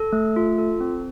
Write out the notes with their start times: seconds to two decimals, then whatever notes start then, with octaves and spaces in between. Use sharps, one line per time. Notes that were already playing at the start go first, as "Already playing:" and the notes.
Already playing: A4
0.13 A3
0.36 F4
0.58 A4
0.80 C4